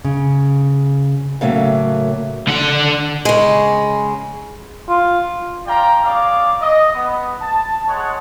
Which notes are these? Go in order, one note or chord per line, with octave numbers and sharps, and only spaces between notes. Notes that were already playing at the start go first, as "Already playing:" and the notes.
C#3
A2 C#3 F#3 A3 A#3
D3 F#5
C#3 G#3
F4
D4 F4 D5 F5 G5 A#5
C#4 G#4 D5 F5 D6
D#5
B3
A5
G#3 C#5 F#5